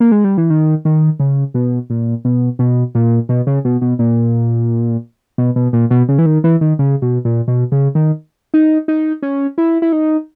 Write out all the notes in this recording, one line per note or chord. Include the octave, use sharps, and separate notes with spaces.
A#3
G#3
G3
E3
D#3
D#3
C#3
B2
A#2
B2
B2
A#2
B2
C#3
B2
B2
A#2
B2
B2
A#2
B2
C#3
E3
D#3
E3
D#3
C#3
B2
A#2
B2
C#3
D#3
D#4
D#4
C#4
E4
E4
D#4